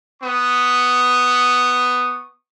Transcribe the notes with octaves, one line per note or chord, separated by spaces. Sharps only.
B3 C#6 D#6